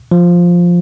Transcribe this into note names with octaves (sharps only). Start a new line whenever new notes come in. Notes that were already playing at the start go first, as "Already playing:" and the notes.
F3